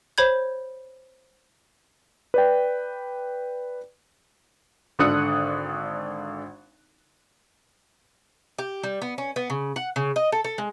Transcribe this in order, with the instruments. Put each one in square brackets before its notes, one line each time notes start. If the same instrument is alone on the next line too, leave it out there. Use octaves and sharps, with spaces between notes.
[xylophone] C5 C#5 B5 G6 G#6
[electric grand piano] B4 D5 G5
[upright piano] G#1 D3 D4 D#6 F#6 C#7
[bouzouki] G4
G3
B3
C#4
B3
C#3
F#5
C#3
D#5
A4
A4
G#3